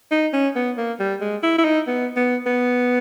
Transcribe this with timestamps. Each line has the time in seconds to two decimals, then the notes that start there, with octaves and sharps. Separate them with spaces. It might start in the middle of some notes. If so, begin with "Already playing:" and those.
0.11 D#4
0.33 C#4
0.56 B3
0.77 A#3
1.00 G3
1.21 G#3
1.43 E4
1.59 E4
1.65 D#4
1.87 B3
2.16 B3
2.46 B3